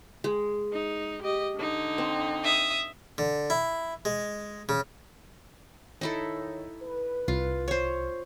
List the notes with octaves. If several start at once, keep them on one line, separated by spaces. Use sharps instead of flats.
G#3
D#4
G4 D#5
D3 D#4
C4
E5 D#6
D3
E4
G#3
C#3
D#3 D#4 E4 A4 C#5
B4
C2 F4
C5 C#5